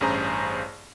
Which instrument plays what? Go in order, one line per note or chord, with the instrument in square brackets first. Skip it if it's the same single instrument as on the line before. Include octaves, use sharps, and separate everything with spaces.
[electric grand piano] A1 G2 C#4 G#4 C5 A#5